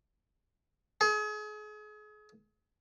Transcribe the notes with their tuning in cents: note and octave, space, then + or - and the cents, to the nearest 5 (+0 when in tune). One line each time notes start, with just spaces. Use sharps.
G#4 +35